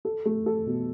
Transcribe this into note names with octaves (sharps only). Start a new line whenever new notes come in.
A4
A3
A4
B2